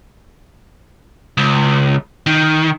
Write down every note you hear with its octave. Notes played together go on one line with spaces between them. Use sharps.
C#2
D#3